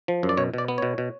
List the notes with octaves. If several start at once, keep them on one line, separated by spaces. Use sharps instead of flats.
F3
F#2
D5
B2 C#5
B2 D5
B3
B2 C#5
B2